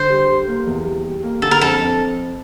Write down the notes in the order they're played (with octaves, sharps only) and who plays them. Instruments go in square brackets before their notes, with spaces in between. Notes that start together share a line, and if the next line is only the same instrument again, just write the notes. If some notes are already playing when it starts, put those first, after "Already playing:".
Already playing: [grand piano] D3 [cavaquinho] C5
[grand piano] G3
G3
A#3
E2
G3
G3
A#3
[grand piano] D3 [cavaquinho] A4
[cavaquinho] A#4
[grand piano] F2 [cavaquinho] A4
[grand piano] F2